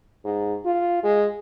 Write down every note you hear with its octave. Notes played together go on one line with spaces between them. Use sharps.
G#2
F4
G#3